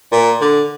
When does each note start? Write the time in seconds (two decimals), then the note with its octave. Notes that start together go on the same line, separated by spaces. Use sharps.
0.12 A#2
0.41 D3